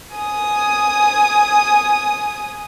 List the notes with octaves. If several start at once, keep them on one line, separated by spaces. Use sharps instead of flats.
G#5 D#6